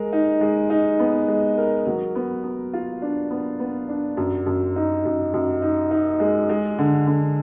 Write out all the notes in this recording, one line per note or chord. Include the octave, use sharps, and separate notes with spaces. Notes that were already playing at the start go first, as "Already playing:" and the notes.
Already playing: G#3 A#4
D#4
G#3
D#4
B3
G#3
A#4
F#3
B3
B3
F4
D4
B3
B3
D4
F#2
F#2
D#4
F#2
F#2
D#4
D#4
G#3
G#3
D3
D3